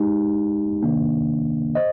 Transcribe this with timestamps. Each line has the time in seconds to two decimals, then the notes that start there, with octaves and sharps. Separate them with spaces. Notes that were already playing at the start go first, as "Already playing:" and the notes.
Already playing: G#3 D#4 G4
0.83 C3 D#3 A#3 D4
1.75 C5 D#5